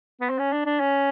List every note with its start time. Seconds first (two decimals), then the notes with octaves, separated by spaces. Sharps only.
0.21 B3
0.30 C4
0.39 C#4
0.52 D4
0.65 D4
0.80 C#4